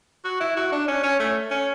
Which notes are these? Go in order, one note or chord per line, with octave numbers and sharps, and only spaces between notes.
F#4
E4
F#4
D4
C#4
C#4
A3
C#4